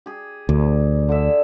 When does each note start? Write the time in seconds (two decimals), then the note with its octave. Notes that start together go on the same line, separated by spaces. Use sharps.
0.06 G4 G#4
0.49 D2 D5
1.09 D3 D4 E5